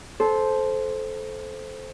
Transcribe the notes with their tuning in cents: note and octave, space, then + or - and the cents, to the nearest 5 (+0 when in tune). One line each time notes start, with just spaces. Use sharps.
A4 -20 C5 +0